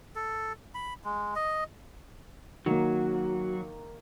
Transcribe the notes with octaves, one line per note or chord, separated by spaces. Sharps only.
A4
B5
G#3
D#5
D#3 F#3 A#3 F#4